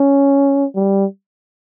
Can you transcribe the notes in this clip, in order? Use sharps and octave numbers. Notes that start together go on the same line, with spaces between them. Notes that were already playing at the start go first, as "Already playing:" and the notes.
Already playing: C#4
G3